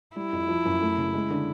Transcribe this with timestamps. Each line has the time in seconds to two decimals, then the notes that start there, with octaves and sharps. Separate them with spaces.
0.16 G3 E4
0.33 F2
0.48 F3
0.65 F#2
0.82 A3
0.98 C#3
1.14 G#3
1.30 D3